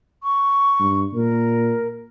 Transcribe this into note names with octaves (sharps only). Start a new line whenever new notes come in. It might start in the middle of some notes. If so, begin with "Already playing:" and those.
C#6
G2
A#2 A#4